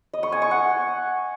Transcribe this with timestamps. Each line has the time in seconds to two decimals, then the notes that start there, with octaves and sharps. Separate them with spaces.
0.13 D#5
0.23 C#6
0.32 G#5
0.42 C#6
0.51 F#5